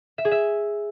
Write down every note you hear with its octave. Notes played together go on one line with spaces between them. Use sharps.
E5
G#4
E5